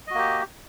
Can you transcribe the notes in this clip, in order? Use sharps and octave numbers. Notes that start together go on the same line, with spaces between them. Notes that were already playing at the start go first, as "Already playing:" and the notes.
A#3 F#4 G4 D#5